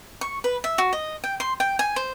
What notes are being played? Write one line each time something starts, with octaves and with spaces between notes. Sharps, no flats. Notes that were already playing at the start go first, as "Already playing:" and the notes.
C#6
B4
E5
F#4
D#5
G5
C6
G5
G#5
C5